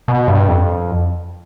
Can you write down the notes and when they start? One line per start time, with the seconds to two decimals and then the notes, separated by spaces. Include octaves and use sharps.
0.08 B2
0.28 G2
0.48 F2